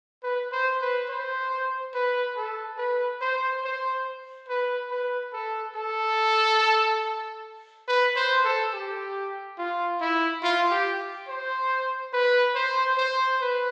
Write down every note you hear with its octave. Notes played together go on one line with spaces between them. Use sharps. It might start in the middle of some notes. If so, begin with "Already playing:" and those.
B4
C5
B4
C5
B4
A4
B4
C5
C5
B4
B4
A4
A4
B4
C5
A4
G4
F4
E4
F4
G4
C5
B4
C5
C5
B4